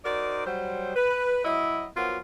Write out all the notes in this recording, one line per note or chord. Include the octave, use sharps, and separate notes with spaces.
D#4 F#4 A#4 C5 D5
F#3 G3 C5
B4
F#3 E4 D#5
F3 F#3 B3 F4 F#4 A#4